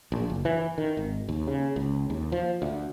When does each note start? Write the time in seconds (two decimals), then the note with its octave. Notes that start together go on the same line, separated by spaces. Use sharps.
0.12 A#1
0.30 F#1
0.45 E3
0.78 D#3
0.97 G#1
1.29 D#2
1.47 C#3
1.76 C#2
2.10 D#2
2.32 F3
2.62 D2